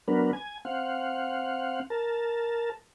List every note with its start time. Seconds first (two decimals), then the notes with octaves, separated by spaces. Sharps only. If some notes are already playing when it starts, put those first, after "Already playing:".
0.08 F#3 B3 D4 A#4 B4
0.33 G#5
0.65 C4 F5 F#5
1.90 A#4 A5